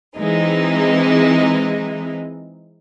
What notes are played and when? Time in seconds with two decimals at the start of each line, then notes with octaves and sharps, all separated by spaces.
0.16 E3 G#3 C4 D#4